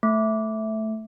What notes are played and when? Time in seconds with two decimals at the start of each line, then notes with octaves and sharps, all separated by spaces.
0.03 A3